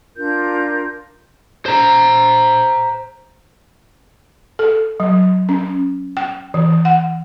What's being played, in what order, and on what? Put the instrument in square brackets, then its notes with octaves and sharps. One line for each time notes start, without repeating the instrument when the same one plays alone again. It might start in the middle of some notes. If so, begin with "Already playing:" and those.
[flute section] D4 F4 A#4 G6
[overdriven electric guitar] C5 A#5
[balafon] A4
F#3
C#4
G5
E3
F#5